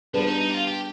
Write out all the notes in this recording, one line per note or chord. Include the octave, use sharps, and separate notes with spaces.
F3 G3 B3 D4 G#4 B4
D#4
D#4
G4
F4
G4